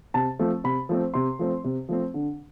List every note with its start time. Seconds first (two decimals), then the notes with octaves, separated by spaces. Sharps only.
0.14 C3 A5
0.39 F3 A3 C4
0.64 C3 B5
0.89 F3 A3 C4
1.14 C3 C6
1.39 F3 A3 C4
1.64 C3
1.89 F3 A3 C4
2.14 D3